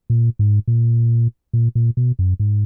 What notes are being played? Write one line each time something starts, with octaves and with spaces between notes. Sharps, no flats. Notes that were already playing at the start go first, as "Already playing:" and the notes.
A#2
G#2
A#2
A#2
A#2
B2
F#2
G#2